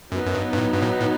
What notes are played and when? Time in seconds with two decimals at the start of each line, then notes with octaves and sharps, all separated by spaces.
0.12 F#2 F#3 B3 D#4
0.27 F#2
0.35 G2
0.53 G2
0.58 A2
0.73 G2
0.82 A2
1.00 A2